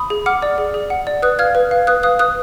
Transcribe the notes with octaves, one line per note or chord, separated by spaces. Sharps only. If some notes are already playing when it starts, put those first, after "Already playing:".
Already playing: B5 D#6
G#4
F#5 D6 F6
D5
G#4
G#4
F#5
D5
B4 D#6 F#6
F5 F6 G#6
B4
F5
B4 D#6 F#6
F5 D#6 F#6
B4 D#6 F#6